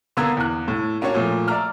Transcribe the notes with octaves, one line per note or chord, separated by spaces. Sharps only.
D3 A#3 B3 A#5 E6 G#6
E2 F#6
A2
A#3 C#4 D4 F#4 C#5
A#2 F3 A3
D5 E5 A#5 F6